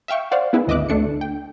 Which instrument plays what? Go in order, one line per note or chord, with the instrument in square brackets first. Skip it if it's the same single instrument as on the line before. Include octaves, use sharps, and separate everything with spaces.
[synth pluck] E5 F5 G5 C#6
C5 D5 F5 F#5
B3 E4 G#4 B4
G#1 D2 D#5 E5 D6 F#6
D2 A3 D4 C#7
G5